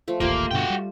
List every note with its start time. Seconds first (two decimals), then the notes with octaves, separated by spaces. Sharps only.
0.08 F3 A3
0.20 D#1 A1 D#2 A#3 F4 G4 D5
0.51 G2 B2 D3 F#4 G5
0.70 G3